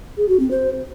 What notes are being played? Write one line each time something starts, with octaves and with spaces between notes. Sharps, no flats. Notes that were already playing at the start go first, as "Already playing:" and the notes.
G#4
F#4
C4
C5